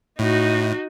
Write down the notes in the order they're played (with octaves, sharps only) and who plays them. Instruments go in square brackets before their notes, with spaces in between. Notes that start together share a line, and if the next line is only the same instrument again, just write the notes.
[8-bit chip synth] A2 [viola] D#4 F#4